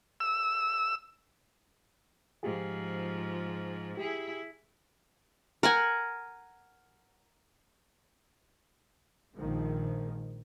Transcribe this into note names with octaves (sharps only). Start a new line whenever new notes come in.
E6
G#2 F3 F4 G4 G#4
E4 G4 G#4
A#4 F#5 G#5
A#1 D#3 F3 G#3